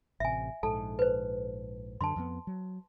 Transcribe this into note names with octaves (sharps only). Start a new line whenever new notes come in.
A1 C3 E5 G#5
A#1 G#2 A4 A5
B4 C5
F#2 D3 A5 C6
F2 C#3 B3
F#3